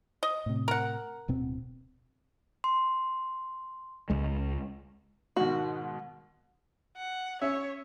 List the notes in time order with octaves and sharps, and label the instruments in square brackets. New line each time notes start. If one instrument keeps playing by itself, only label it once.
[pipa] D#5
[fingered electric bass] A2 C3
[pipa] A#4 F#5
[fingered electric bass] D1 B2 C4
[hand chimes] C6
[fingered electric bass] C#2 G#3
[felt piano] G#2 B2 D#3 [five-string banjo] F#4
[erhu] F#5
[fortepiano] C#4 E5 [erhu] C#5